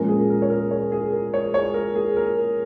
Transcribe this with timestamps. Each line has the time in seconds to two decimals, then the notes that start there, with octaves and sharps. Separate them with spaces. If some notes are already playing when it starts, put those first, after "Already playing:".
Already playing: A#2 F3 G#3 C#4 A#4
0.08 G#4
0.30 A#4
0.42 C#5
0.50 A#4
0.71 C#5
0.92 G#4
1.13 A#4
1.34 C#5
1.54 C#5
1.74 A#4
1.95 G#4
2.16 A#4